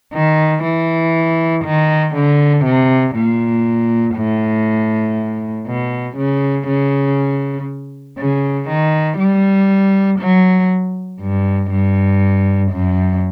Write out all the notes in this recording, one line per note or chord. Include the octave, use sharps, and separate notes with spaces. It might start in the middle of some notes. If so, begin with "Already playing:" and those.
D#3
E3
D#3
D3
C3
A#2
A2
B2
C#3
C#3
C#3
D#3
G3
F#3
G2
G2
F#2